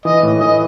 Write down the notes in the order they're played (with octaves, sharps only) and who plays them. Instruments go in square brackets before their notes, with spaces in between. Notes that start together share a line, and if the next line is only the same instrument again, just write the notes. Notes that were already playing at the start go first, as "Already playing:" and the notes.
[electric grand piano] E3 [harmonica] D#5
[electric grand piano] A2
[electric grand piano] E3 [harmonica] D#5